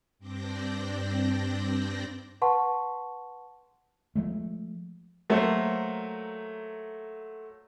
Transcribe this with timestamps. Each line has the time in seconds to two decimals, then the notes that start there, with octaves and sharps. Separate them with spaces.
0.18 G2 C4 D4 D5 G6 A#6
2.42 B4 F#5 A5 C6 C#6
4.16 F3 G#3 A3
5.30 F#3 A3 A#3 C5